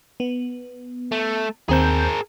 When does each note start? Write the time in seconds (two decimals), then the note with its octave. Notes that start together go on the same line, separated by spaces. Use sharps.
0.20 B3
1.12 A3
1.69 D#2 C4 G#4 A#4 G6